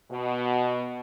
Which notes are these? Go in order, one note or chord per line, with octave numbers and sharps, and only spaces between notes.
B2